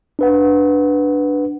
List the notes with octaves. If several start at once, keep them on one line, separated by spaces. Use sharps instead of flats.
D4 B4 F#5